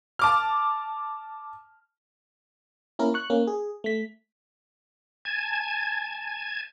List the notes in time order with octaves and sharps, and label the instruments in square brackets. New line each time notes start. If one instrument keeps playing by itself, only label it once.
[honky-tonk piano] A5 D6 F6
[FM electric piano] A#3 C#4 E4 A#4
C#6 F#6
A#3 C#4 A#4
G#4
A3 B6
[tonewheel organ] G#5 A5 G#6